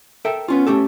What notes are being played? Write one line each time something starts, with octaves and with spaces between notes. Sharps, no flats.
A4 A#4 E5 G5
B3 C#4 F4
A3 C#4 G4 A4